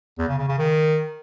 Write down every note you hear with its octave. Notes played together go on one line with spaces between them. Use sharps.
E2
C#3
C#3
C#3
D#3